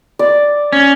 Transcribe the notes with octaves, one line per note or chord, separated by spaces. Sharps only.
D5
C#4